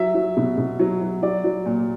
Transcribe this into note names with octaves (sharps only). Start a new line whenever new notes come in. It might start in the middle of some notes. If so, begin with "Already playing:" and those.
Already playing: F#3 E5
F#3
B2
B2
F#3
F#3
F#3 D5
F#3
A#2